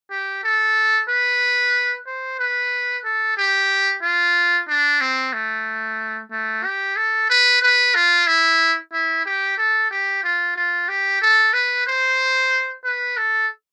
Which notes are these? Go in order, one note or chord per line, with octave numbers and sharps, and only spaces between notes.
G4
A4
B4
C5
B4
A4
G4
F4
D4
C4
A3
A3
G4
A4
B4
B4
F4
E4
E4
G4
A4
G4
F4
F4
G4
A4
B4
C5
B4
A4